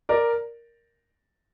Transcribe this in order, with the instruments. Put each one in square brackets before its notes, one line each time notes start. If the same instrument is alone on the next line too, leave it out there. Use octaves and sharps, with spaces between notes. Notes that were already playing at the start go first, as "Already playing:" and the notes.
[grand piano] A#4 D5